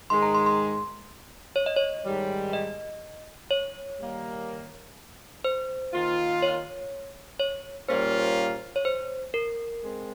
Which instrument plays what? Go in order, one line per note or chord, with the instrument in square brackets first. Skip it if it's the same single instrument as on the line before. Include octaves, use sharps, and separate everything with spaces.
[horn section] G#2 D#3 G#3 [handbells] C6
[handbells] A#5
C6
C6
C#5
D#5
C#5
[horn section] G#2 D#3 G3
[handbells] D#5
C#5
[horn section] D#3 G3 A#3
[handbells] C5
[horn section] D#3 A#3 F4
[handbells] C#5
C#5
[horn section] A#2 G3 A#3 C#4 F4 [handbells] C5
[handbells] C#5
C5
A#4
[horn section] G#3 C4